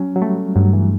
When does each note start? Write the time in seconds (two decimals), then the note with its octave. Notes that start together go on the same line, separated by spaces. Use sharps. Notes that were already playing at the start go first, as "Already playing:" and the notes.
Already playing: F#3 C#4
0.16 F#3
0.22 G3 A3
0.56 G2 F#3
0.73 E3